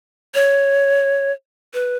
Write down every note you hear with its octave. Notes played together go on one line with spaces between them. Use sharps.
C#5
B4